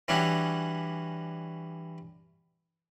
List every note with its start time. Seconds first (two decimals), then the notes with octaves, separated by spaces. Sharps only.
0.08 E3 G3 C#4 D4 E4 F#4